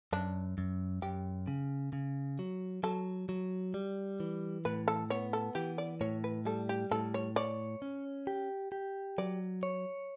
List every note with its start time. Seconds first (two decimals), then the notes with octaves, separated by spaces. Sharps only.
0.13 F#2 D4
0.58 F#2
1.02 F#2 G4
1.48 C#3
1.93 C#3
2.39 F#3
2.83 F#3 A4
3.29 F#3
3.74 G3
4.20 E3
4.65 A2 B4
4.88 A4
5.10 B3 C#5
5.33 A4
5.55 E3 G4
5.78 D5
6.01 A2 C#5
6.24 B4
6.45 G3 A4
6.69 G4
6.91 A2 A4
7.14 C#5
7.36 C#5 D5
7.82 C#4
8.27 G4
8.72 G4
9.18 F#3 D5
9.63 C#5